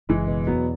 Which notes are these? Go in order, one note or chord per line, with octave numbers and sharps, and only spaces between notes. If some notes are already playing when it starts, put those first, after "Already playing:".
F#1 E3 G#3
B2
E2 F#3 B3